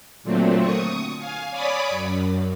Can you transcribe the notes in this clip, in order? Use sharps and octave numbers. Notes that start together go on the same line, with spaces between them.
A#2 D3 F#3 A3 C4
C#6 D#6
F5 G#5
C#5 D5 G#5 B5 D6 D#6
F#2